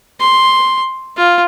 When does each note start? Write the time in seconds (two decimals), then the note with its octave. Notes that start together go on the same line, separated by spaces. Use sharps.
0.20 C6
1.17 F4